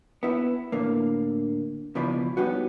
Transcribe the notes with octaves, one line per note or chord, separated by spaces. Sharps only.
B3 E4
A2 D3 A#3
C#2 B2 F3 E4 D5 B5
G3 B3 C#4 D#4 F#4